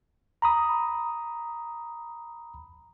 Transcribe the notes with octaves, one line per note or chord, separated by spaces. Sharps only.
A#5 B5 D#6